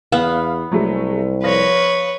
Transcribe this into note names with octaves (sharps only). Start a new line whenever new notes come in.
E2 B3 F5
C2 F#3 G#3 A3
F3 B4 C#5 A#6